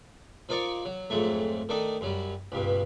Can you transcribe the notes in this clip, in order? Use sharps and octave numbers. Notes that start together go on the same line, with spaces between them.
F3 D#4 A#4 D5 C#6
F#3
F2 G#2 F#3 A3
D#3 A3 D4 D#4
F#2 F#3 G3
C#2 G2 B2